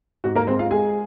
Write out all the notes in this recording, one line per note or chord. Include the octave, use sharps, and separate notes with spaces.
G#2 F#4
A#3 A#4
G#3 C4 C5
F4 F5
G#3 G#4 G#5